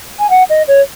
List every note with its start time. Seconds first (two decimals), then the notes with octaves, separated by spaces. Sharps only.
0.19 G#5
0.30 F#5
0.49 D#5
0.68 C#5